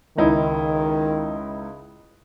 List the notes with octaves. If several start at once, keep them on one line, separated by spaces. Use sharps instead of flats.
C#2 D#3 D#4 E4